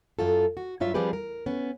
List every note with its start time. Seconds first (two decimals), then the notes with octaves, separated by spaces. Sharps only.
0.19 F#2 F4 F#4 A4
0.57 F#4
0.80 G2 F#3 F4 C#5 E5
0.94 F3 G3 C4 G4 G#4 B4
1.13 A#4
1.46 B3 C#4